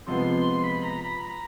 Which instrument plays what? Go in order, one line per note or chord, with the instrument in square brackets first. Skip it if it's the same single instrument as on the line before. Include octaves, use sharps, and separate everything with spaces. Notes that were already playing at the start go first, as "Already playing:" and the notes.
[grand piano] C3 F3 G#3 B3 [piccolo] C6
[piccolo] B5
A#5
B5
A#5